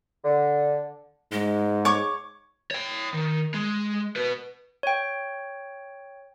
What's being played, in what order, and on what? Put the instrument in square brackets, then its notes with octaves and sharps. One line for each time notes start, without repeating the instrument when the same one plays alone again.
[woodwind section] D3
[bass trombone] G#2 [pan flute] G#3
[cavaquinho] C#5 C#6 D6
[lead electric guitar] C#5 G5
D#3
G#3
F#4 B4
[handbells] C#5 G5